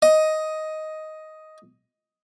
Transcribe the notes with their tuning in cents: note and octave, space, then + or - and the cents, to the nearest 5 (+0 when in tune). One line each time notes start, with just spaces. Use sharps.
D#5 +5